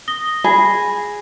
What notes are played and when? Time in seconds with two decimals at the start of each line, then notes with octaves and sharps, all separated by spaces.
0.08 D#6 A#6 G7
0.44 G#4 B5 A#6